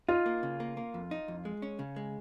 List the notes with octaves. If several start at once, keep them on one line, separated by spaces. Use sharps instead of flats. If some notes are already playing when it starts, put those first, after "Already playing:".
D#4 F4
A#3
C#3
A#3
A#3
F2
D#4
F2
G#3
C#4
C#3
G#3